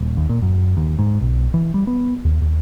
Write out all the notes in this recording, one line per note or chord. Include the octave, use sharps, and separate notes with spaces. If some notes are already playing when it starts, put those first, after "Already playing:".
D#1
D#2
A#2
F#2
D#2
G#2
B1
E3
G3
B3
D#2
D#2